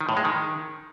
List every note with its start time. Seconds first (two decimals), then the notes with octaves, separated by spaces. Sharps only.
0.01 D#3
0.09 A2
0.17 G#3
0.25 D#3